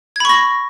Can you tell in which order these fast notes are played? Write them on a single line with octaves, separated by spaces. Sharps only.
G#6 B5 C#6 A#6